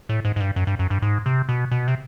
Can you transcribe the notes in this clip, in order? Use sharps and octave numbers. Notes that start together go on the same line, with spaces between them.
A2
G#2
G#2
G2
F#2
G2
F#2
G2
G#2
C3
B2
B2
C3